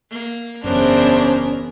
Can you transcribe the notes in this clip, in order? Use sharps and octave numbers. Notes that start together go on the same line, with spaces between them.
A#3
F#1 E2 B3 C#4 D4 A#4 C5